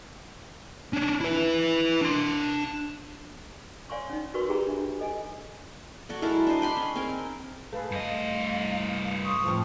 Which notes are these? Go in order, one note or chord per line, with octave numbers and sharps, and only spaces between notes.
C#4 D4
E4 B4
D4 C6
C#5 D5 F5 G#5 C6 C#6
C#4 D#4
F#4 A#4 B4 D5 C6 C#6
D#4 G4 G#4 G5 A#5 B5
D4 E5
A4 D#5 G#5
F#3 F#4 A4 D5
G#3 E4 A4 A#4
D4 C5 D#5
D#5 G5 B5 C6
C#4
C4 D#4 G#4 A#4
A3 G#4 B4 F5
G2 D#5 F5
C6 C#6 D#6
F2 A2 F3